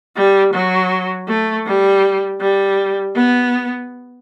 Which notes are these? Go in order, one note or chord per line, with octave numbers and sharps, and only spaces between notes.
G3
F#3
A3
G3
G3
B3